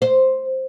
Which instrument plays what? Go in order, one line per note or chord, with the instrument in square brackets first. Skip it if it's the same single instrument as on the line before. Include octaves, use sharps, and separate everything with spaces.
[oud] C5